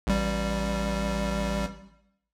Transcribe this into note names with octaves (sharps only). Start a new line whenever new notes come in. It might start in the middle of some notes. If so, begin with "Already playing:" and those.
A1 G3